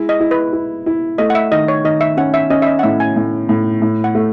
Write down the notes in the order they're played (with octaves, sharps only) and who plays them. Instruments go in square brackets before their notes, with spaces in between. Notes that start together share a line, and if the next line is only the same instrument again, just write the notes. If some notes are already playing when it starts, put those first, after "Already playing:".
Already playing: [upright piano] G#3 E4
[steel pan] D#5
[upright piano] E4
[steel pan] B4
[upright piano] E4
E4
[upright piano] A3 [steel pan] D#5
[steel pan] F#5
E5
[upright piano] D#3 [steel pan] D#5
[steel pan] C#5
[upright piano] D#3 [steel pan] D#5
[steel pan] E5
[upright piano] C#4 [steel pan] F#5
[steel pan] E5
[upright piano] C#4 [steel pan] D#5
[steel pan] E5
D#5
F#5
[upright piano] A2 [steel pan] E5
[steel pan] G#5
[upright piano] A2
A2
A2
[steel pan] F#5
[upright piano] A3